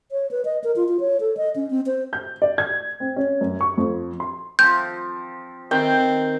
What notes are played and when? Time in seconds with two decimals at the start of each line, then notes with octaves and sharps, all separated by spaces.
0.12 C#5
0.31 B4
0.45 D#5
0.64 A#4
0.76 F4
0.89 F4
1.00 C#5
1.20 A4
1.37 D#5
1.56 C#4
1.70 C4
1.86 C5
2.13 G6
2.42 D5
2.58 G#6
3.00 C4
3.16 C#4
3.41 F#2
3.61 C#6
3.77 F2
4.20 C6
4.59 F3 C4 G6
5.71 D#3 C4 G5